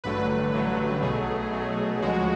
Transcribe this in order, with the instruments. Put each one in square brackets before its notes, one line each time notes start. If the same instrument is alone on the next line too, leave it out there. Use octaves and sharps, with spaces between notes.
[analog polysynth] A1 G2 D3 F#3 A3 B4
B4
A1 G2 D3 F#3 A3
B1 B2 F#3 A3 G#4
B1 B2 F#3 A3
D2 C#3 F3 G#3 F#4